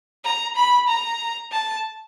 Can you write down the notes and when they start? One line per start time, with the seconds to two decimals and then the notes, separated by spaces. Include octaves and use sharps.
0.24 A#5
0.56 B5
0.88 A#5
1.51 A5